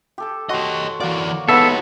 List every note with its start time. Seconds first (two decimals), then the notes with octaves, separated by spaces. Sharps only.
0.18 G4 A4 A5
0.49 F#4 G4 C#5 D#5 C6
1.00 E3 A#3 F#4 D5
1.49 G#3 B3 D#4 G4 A4 C#5 E5 A5